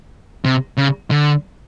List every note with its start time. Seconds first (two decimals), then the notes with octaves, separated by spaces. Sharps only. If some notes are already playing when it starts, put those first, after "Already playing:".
0.45 C3
0.77 C#3
1.11 D3